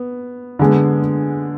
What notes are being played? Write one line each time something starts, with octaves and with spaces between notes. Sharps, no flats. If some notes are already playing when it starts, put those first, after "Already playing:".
Already playing: B3
D3 G#3 B3